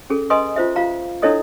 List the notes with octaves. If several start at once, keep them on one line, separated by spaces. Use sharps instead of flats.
C#4 G#4 A4
B4 D#5 G#5 C6 D#6
F4 C5 E5
F4 F5 A#5
D4 E4 A4 C#5 D#5 D#6